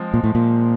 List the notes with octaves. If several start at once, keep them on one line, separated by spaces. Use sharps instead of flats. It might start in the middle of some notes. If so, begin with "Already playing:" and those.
Already playing: F3 G#3 C4
A#2
A2
A#2